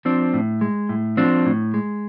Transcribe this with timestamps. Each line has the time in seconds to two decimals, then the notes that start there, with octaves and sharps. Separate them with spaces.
0.05 F3 C4 D4
0.34 A2
0.61 G#3
0.89 A2
1.17 F3 C4 D4
1.46 A2
1.74 G#3